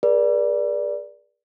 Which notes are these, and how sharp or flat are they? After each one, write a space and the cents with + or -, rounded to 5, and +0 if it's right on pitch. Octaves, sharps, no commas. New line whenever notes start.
G#4 +0 B4 -45 D5 +0